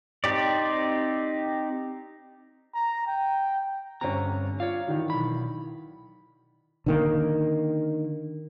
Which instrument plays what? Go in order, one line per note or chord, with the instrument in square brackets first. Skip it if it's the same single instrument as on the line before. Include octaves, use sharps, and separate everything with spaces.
[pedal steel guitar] C4 D#4 G4 D5
[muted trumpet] A#5
G5
[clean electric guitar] G2 D3 A#5 [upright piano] C4 C#4
[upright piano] F4 D5 [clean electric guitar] C#5 F5
[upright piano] D#3 E3 D4
[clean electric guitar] B1 B5
[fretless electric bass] D3 D#3 A#3